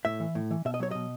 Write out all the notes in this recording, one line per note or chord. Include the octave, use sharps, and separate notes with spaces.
A2 E5
E3
A2
E3
B2 E5
D#5
F#3 C#5
B2 D#5